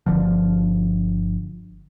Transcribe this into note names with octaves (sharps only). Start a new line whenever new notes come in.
G1 D3 F3